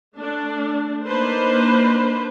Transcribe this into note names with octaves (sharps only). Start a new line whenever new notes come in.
A3 D4
A#3 D4 D#4 B4 C5